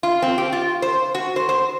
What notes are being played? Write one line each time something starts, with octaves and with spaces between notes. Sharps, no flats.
F4
C4
G4
F4
C5
F#4
C5
C5